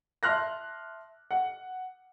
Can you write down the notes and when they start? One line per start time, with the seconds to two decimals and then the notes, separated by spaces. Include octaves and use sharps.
0.23 E5 A5 C6 F6 F#6 A#6
1.31 F#5